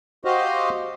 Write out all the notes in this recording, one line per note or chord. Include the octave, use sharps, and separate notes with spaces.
F#4 G4 C5 D#5 F5